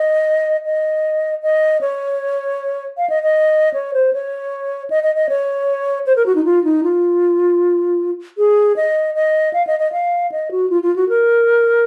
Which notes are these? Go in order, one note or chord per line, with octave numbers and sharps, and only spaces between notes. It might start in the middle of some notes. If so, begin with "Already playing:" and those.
Already playing: D#5
D#5
D#5
C#5
F5
D#5
D#5
C#5
C5
C#5
D#5
D#5
D#5
C#5
C5
A#4
F#4
D#4
F4
D#4
F4
G#4
D#5
D#5
F5
D#5
D#5
F5
D#5
F#4
F4
F4
F#4
A#4